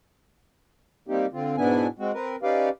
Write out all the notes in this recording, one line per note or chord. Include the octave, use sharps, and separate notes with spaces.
G3 A#3 C4 D#4 G4
D3 C4 F4
G#2 B2 B3 D4 E4 G#5
G#3 C4 F#4
C4 A#4 B4
C#4 D#4 G4 B4 D5 F5